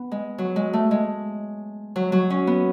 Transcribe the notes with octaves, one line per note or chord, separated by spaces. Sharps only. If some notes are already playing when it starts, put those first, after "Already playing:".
Already playing: B3
G#3
F#3
G#3
A3
G#3
F#3
F#3
C#4
B3